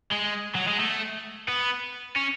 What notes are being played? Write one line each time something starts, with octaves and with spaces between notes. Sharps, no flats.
G#3
F#3
G#3
A3
B3
C#4